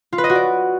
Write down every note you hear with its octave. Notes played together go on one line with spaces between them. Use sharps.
F4
B4
D#5
F#4
D5